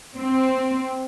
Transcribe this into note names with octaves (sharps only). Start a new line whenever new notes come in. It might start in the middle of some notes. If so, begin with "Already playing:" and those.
C4